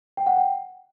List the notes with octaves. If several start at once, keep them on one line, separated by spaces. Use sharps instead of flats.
G5
F#5
G5